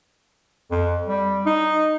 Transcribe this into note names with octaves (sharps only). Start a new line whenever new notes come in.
F2
G3
D#4